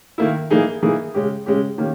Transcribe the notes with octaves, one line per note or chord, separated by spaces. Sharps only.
D#3 A#3 E4
E3 A#3 D#4 G#4
E3 A#3 D#4 G#4
C#3 G#3 C#4 G4
C#3 G#3 C#4 G4
D#3 A#3 C#4 G4